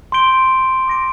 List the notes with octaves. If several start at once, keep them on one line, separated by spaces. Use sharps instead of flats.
C6 G6 D7 G7
D6 A#6 D7